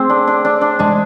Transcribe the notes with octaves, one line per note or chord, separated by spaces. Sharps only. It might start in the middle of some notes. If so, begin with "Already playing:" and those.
Already playing: A3 C4 G#4
D4
D4
D4
D4
G#3 D4